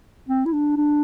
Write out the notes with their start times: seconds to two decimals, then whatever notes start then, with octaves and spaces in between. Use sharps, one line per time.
0.29 C4
0.46 E4
0.53 D4
0.77 D4